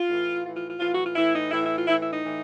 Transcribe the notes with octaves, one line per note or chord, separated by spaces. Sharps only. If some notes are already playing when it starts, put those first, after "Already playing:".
Already playing: F4
A2 E3
A2 E3 F4
F4
F4
A2 E3 F4
F#4
F4
A2 E3 E4
D#4
A2 E3 E4
E4
F4
A2 E3 E4
E4
D#4
A2 E3